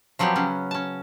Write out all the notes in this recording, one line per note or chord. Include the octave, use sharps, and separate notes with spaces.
F3 F#3 B3 C4 G4
C#3 F#3 C#4
C#4 A5